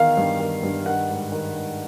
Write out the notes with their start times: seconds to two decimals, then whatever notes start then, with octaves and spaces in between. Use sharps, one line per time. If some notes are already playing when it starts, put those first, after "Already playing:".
Already playing: E2 D#3 F5
0.17 G2
0.40 D#3
0.63 G2
0.86 D#3 F#5
1.09 G#2
1.32 D#3
1.55 G#2